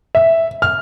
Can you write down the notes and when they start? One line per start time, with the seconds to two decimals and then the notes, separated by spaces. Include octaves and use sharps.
0.15 E5
0.62 F6